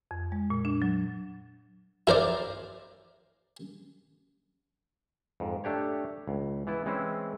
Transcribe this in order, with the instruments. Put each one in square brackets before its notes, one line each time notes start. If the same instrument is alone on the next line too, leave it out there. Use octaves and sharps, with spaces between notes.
[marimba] F2
G#3
A#2
D4
F#3
[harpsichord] E4 A#4 C5 D5
[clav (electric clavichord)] F2 G#2
A3 D4 G4 C#5
C#2
E3 B3 E4
E3 G#3 C4 C#4 E4